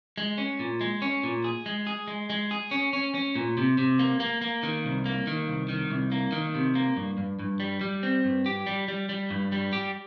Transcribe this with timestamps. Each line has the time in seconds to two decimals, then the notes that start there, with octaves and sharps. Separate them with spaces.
0.18 G#3
0.38 C#4
0.59 A#2
0.81 G#3
1.02 C#4
1.23 A#2
1.44 G#4
1.66 G#3
1.87 G#4
2.08 G#3
2.30 G#3
2.51 G#4
2.71 C#4
2.93 C#4
3.15 C#4
3.35 A#2
3.57 C3
3.78 C3
3.99 A#3
4.20 A#3
4.41 A#3
4.63 D#3
4.85 C2
5.06 A#3
5.27 D#3
5.48 C2
5.69 D#3
5.90 C2
6.12 A#3
6.32 D#3
6.55 C3
6.75 A#3
6.97 G2
7.18 G2
7.39 G2
7.60 G3
7.81 G3
8.03 C4
8.25 G2
8.46 G4
8.66 G3
8.88 G3
9.09 G3
9.31 G2
9.52 G3
9.73 G4